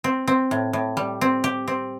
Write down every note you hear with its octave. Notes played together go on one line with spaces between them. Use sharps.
C4
C4
A2
A2
G3
C4
G4
C4